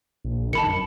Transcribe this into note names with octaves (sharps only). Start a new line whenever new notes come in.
A#1
D#3 A5 B5 C#7
F#2